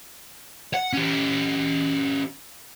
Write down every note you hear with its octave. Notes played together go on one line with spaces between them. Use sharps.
F#5
C#4 G4